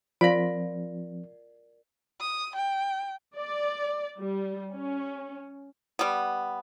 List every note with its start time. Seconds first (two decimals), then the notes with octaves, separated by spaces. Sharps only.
0.21 F3 C4 F4 A#4 D5 B5
2.20 D#6
2.55 G5
3.35 D5
4.17 G3
4.74 C#4
5.99 G3 B3